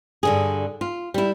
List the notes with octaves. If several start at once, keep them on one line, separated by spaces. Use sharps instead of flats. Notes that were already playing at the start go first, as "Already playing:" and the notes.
G2 D3 G#4
F4
G3 E4